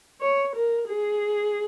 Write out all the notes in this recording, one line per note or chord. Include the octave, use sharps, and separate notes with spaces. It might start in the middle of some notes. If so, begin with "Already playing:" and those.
C#5
A#4
G#4